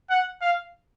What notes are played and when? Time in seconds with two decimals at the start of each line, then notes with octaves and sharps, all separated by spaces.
0.10 F#5
0.41 F5